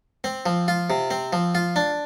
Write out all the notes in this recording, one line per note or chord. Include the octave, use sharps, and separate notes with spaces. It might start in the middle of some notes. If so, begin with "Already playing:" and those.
C4
F3
F4
C3
C4
F3
F4
D4